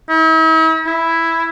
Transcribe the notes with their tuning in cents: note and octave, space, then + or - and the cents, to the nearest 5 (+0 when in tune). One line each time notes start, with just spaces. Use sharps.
E4 -45
E4 +0